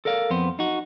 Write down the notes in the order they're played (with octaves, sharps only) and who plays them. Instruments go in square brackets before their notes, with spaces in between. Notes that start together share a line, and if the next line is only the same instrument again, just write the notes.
[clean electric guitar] A4 A#4 D5 F5
F2 B3 C5
D#4 F#4